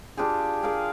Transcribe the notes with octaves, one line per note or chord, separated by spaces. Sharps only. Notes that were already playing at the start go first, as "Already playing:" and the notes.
D4 F4 G4 G#4
G#4 A#4 F5